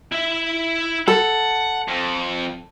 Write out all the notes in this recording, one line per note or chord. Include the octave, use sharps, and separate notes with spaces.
E4 E5
A4 F#5
F2